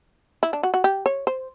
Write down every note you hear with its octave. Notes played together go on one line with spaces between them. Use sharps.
E4
D4
F#4
F#4
G4
C#5
C5